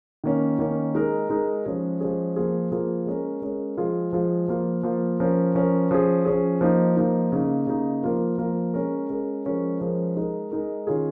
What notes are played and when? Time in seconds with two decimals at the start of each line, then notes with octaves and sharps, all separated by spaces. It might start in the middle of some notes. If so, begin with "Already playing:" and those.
0.24 D#3 A#3 C#4
0.59 D#3 A#3 C#4
0.95 G#3 D#4 A#4
1.29 G#3 D#4 A#4
1.65 F3 G#3 C#4 G#4
2.01 F3 G#3 C#4 G#4
2.36 F3 A#3 F4 G#4
2.71 F3 A#3 F4 G#4
3.06 G#3 C#4 A#4
3.42 G#3 C#4 A#4
3.77 F3 G#3 F4 G#4
4.13 F3 G#3 F4 G#4
4.48 F3 A#3 F4
4.83 F3 A#3 F4
5.20 F3 C#4 A#4
5.55 F3 C#4 A#4
5.91 F3 C#4 G#4
6.25 F3 C#4 G#4
6.61 F3 A#3 D#4
6.97 F3 A#3 D#4
7.32 C#3 A#3 D#4
7.67 C#3 A#3 D#4
8.03 F3 A#3 F4 A#4
8.38 F3 A#3 F4 A#4
8.74 G#3 C#4 A#4
9.09 G#3 C#4 A#4
9.45 F3 G#3 C#4 A#4
9.80 F3 G#3 C#4 A#4
10.16 G#3 D#4 A#4
10.52 G#3 D#4 A#4
10.87 D#3 C#4 F4 G#4